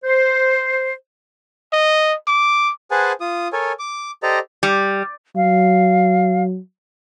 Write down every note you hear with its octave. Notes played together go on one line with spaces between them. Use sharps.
C5
D#5
D6
G#4 B4 C5 F#5 G#5 A5
F4 D#6
A4 A#4 C#5 G#5
D6
G4 A4 C5 D5 D#5 A#5
G3
F#3 F5